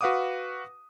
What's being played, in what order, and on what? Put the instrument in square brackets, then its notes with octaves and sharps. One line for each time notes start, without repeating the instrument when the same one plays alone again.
[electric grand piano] F#4 B4 F5 F#5 D6 D#6